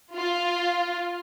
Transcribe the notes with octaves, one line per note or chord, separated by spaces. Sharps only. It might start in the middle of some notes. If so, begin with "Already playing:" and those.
F4